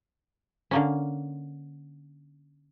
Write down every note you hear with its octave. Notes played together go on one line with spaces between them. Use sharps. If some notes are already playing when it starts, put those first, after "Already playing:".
D3 A#3 C#4